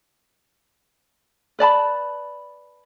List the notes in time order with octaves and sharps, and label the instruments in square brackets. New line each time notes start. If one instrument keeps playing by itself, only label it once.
[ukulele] B4 D5 A5 B5